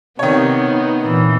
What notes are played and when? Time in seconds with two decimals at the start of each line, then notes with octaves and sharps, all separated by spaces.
0.19 C3 D#3 B3 D#4 C#5
1.00 A#2 E3